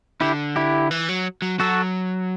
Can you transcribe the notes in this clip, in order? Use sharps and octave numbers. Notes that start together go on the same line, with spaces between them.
D3 E4 G4
E4 G4
E3
F#3
F#3
F#3 F#4 A4